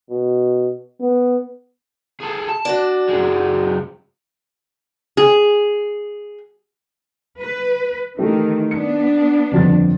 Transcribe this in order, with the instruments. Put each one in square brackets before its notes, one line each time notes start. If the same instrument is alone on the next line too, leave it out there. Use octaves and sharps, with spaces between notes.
[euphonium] B2
B3
[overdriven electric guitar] G#4 A4
A5
[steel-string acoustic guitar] D4 F#4 D5
[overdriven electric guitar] F#2 G#3
[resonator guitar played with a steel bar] G#4
[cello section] B4
[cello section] D#3 E3 [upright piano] A3 G4
[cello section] B3 D4 [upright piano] C#7
[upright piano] G1 F2 A6